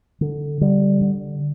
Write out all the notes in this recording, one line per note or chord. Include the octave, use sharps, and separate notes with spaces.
D3
D3 G3
D3